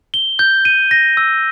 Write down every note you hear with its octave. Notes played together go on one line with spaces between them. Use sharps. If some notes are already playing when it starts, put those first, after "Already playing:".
G7
G6
D#7
A#6
E6